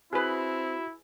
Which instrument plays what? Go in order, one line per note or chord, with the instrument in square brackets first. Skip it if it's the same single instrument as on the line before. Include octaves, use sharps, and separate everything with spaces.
[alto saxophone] C4 [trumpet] E4 [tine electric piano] F#4 [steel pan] G#4 B4